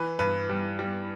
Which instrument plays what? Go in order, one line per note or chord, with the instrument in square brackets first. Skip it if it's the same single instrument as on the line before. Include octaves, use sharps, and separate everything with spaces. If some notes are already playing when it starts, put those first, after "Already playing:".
Already playing: [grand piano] E3 B4
G2 B4
G3
G3